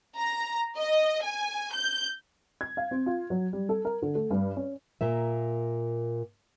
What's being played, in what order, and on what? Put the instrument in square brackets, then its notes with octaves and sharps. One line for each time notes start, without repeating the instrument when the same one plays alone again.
[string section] A#5
D#5
G#5
G6
[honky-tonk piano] G#6
F5
C4
F4
F#3
G3
A4
A#4
D3
A3
G2
C#4
[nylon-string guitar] A#2 A#3 E5